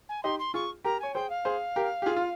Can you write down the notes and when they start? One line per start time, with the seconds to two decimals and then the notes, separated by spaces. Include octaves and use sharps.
0.09 G#5
0.23 D#4 G4 C6
0.39 C6
0.54 F4 G#4 C#6
0.84 G4 A#4 A#5
1.00 C#5 G#5
1.14 G#4 C5 G5
1.30 F5
1.45 G#4 C5
1.76 G4 A#4
2.02 G4
2.06 F4 G#4
2.16 F4